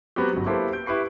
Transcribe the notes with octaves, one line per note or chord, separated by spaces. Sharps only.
F#3 B3 C4 F#4 G4
G1 F#3
A#3 E4 G4 A4 B4 C5
G6 D7
E4 G4 B4 C#6 C7